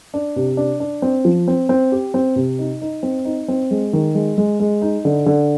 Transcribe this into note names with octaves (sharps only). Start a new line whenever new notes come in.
D4
C3
D4
D4
C4
F3
C4
C4
G4
C4
C3
D#4
D#4
C4
D#4
C4
G#3
D#3
G#3
G#3
G#3
D#4
D3
D3